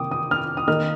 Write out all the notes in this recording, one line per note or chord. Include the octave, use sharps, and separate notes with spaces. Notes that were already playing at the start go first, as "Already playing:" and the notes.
Already playing: C3 D#3 A#3 G5 D6 D#6
D#6
F6
D#6
D#3 A#3 D#4 F6